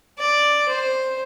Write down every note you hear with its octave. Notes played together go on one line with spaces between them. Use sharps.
D5
C5